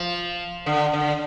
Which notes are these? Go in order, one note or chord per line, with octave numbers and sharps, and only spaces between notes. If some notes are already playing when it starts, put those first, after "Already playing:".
Already playing: F3
D3
D3